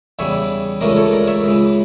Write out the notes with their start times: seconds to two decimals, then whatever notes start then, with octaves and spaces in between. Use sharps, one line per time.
0.19 E2 C#3 E3 G3 C#5 E5
0.81 C#2 C#3 E3 A3 C#4 A#4 D5
0.97 A4 C#5
1.13 A#4 D5
1.28 C#5 E5
1.44 C#2 C#3 E3